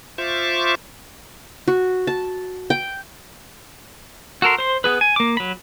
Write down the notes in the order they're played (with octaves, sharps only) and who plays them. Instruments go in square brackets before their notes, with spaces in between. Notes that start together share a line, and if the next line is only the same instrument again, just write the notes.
[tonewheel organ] F4 C5 E5 C#6 D6
[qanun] F#4
A5
G5
[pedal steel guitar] F#4 A4 A#4 C6
C5 C6
B3 G#4 B4
G#5
A#3 D6
F#3 B5